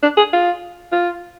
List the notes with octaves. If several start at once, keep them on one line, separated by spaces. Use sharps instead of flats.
D4
G#4
F4
F4